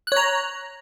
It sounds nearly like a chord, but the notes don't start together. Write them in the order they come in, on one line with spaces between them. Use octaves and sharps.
F#6 C#5 A#5